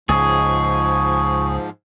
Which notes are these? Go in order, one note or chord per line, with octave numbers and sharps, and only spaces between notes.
C#2 G#2 F3 G#4 C#6